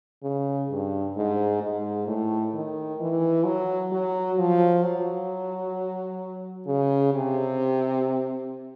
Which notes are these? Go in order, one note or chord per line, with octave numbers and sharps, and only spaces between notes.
C#3
G2
G#2
G#2
A2
D#3
E3
F#3
F#3
F3
F#3
C#3
C3